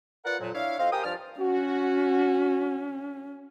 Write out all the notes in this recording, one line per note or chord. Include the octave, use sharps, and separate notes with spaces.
F4 A#4 B4 D5 F#5
F2 A#2 F#3
D4 E4 C#5 F5
F2 C4 D#5 F5
G4 A#4 C5 G5 G#5 D#6
G2 F3 D5 F6
C#4 F#4